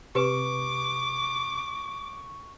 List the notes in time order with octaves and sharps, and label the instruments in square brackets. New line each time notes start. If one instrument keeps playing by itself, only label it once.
[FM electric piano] C3 [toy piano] G4 B4 [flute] C#6 [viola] D6